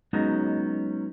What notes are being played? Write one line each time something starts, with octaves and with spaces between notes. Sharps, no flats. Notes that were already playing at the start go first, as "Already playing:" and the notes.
F#3 G#3 B3 C#4 D#4 F#4